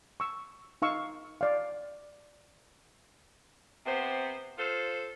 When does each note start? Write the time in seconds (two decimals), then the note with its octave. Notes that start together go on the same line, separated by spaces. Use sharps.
0.20 C#6 E6
0.82 D#4 F5 C#6 E6
1.41 D5 F5
3.86 C3 B3 C5
4.58 F4 A4 C5